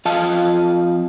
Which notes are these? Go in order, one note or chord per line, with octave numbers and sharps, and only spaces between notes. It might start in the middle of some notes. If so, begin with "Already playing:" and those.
F2 F4 D#5 F5 A5